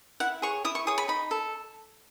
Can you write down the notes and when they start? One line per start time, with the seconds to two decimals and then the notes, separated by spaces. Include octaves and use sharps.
0.20 E4 F#5
0.42 G#4 C#5 C#6
0.65 E4 D#6
0.75 C#6
0.87 G#4 C#5 D#6
0.98 B5
1.08 D#4 B5
1.31 A4